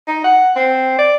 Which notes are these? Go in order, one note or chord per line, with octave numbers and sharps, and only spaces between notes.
D#4
F#5
C4
D5